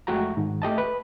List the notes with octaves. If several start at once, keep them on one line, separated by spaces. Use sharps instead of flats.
F2 G#3 A3 F#4 G5 A#5
G#2 D#3
A3 G4 D#5 A5
B4